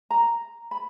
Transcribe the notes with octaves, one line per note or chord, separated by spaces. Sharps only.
A#5
B5